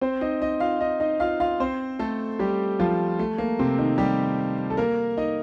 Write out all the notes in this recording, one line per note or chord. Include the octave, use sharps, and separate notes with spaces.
C4 C5
D#4 D#5
D#4 D#5
F4 F5
D#4 D#5
D#4 D#5
F4 F5
F4 F5
C4 C5
A3 A4
G3 G4
F3 F4
A3
A#3
C3 C4
D#3 D#4
G3 G4
A4
A#3 A#4
D#4 D#5